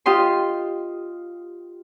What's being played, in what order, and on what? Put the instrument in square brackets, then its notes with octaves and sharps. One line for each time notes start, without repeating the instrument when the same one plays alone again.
[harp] F4 G4 D#5 C6